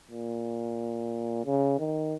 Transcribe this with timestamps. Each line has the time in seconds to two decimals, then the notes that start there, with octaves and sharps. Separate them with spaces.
0.11 A#2
1.45 C#3
1.79 D#3